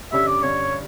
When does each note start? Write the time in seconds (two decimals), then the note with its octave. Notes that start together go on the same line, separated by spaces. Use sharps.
0.12 G2 D3 G3 C#4 E5
0.27 D5
0.43 G2 D3 G3 C#4 C#5